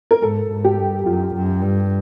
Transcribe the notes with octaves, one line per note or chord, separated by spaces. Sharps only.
A#4
G#2 A4
G#2
G4
G2
F#2 F4
F#2
G2